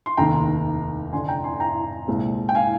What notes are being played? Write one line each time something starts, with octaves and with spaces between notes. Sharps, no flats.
C6
F1 D#2 D#3 G5 A#5
F1 F2 D3 G#5 C6
G5 A#5
G#5 C6
G5 A#5
C2 A#2 G#3 C4
G5
F5 G#5